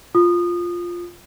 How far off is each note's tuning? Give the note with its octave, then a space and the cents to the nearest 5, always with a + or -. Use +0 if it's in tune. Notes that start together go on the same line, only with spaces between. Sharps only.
F4 +0 D#6 -25